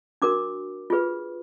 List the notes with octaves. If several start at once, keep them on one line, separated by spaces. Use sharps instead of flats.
D4 F#4 A#4 D6
F4 G#4 B4